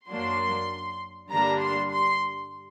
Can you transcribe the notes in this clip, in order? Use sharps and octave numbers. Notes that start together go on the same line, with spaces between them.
F#2 F#3 A#3 D4 C6
G2 D3 G3 A#3 D4 A#5
C6
C6